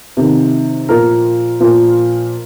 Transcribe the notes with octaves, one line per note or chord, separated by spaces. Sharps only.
C3 D#3
A#2 F3 A#4
A#2 F3